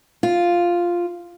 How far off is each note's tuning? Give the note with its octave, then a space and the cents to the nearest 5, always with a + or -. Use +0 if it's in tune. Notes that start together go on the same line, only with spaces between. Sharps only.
F4 +0